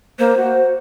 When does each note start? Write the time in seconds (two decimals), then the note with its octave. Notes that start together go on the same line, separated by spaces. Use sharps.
0.19 A#3 C5
0.37 F#4